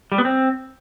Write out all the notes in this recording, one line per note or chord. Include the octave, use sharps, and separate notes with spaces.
G3
B3
C4